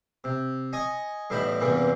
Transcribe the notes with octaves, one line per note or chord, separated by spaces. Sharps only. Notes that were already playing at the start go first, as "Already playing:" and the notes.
C3
D#5 G#5 C#6 D#6
E2 A2 G3 D#4 E5 B5
E2 G2 C3 E3 A#3